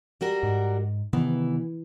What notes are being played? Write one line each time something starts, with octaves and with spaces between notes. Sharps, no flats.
G3 F#4 A#4
G#2
C3 D#3 E3 B3